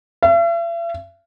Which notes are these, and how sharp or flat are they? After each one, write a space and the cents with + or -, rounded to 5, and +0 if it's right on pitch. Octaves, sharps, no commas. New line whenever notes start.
E5 +45